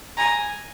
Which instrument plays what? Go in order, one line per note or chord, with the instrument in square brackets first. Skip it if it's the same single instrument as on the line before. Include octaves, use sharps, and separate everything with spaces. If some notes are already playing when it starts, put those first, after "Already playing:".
[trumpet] G#5 [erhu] A#5